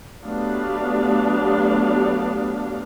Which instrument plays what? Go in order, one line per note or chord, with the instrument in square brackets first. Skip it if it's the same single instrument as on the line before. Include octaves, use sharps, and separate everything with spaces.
[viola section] F#3 A3 B3 D4 G4 F5